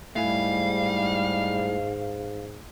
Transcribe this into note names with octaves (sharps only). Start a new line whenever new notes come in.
G#2 G3 A3 E4 F5 G#5